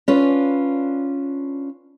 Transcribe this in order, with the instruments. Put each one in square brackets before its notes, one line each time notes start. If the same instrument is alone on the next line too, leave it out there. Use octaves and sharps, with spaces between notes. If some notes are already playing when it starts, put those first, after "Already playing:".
[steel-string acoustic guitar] C#4 D4 F4 B4